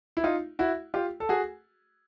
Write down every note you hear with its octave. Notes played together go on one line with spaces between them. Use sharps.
E4
D#4 F4
E4 F#4
F4 G4
A4
F#4 G#4